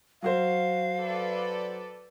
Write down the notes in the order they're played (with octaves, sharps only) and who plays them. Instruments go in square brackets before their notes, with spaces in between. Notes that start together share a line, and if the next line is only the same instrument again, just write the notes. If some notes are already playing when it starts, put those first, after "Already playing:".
[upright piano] F#3 F#4 C5 [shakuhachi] F5
[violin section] A4 B4 D5